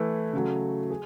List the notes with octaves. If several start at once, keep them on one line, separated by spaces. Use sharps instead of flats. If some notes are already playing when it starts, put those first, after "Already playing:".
Already playing: E3 A3 E4
C#3 F#3 A3
G#4